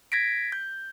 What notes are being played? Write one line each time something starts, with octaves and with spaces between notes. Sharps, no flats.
G#6 A#6 B6 D7
G6